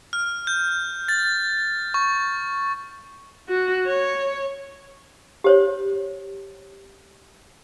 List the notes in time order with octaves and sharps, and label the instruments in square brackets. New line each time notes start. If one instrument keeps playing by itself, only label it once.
[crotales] F6
G6
A6
C#6
[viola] F#4
C#5
[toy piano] G4 C5 C#5